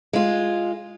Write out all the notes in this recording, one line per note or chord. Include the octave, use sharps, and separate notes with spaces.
G#3 F4